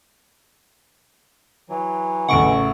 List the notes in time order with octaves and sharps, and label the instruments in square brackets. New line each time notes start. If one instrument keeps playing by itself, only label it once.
[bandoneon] E3 F#3
[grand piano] A1 A2 E4 [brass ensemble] C#3 A4 [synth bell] F#5 C#6 D7